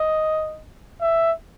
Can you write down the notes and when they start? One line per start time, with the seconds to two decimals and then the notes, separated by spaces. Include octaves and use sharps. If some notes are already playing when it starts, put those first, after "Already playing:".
Already playing: D#5
1.01 E5